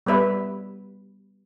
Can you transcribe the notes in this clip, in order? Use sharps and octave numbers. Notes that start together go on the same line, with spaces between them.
G3 B3 B4 E5